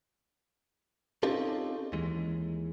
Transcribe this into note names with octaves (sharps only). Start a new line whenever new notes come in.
C4 C#4 D#4 F4 G4 A4
D#2 E3 G#3